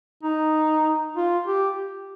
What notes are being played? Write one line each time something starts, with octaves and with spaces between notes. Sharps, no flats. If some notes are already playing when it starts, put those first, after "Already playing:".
D#4
F4
G4